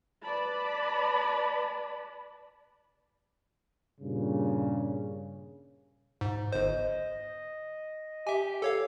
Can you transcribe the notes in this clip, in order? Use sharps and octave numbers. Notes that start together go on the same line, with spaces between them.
B4 D5 A5 B5
G2 A#2 C#3
G#2
G1 C5 D#5
G4 E5 G#5
A4 C#5 F5